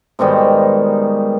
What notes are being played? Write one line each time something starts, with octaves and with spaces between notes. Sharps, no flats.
G#2 B2 D#3 G3